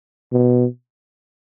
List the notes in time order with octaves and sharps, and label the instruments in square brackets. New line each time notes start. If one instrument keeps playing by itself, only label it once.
[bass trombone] B2